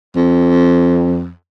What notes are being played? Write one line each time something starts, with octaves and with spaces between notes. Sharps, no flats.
F2